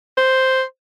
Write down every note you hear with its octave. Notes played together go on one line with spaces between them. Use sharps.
C5